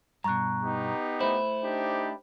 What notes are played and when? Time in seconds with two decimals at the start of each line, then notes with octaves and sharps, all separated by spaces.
0.24 G2 B2 A#5 C#6 F#6
0.64 B3 D#4 G4
1.21 A3 E4 C5
1.63 D4 D#4 G4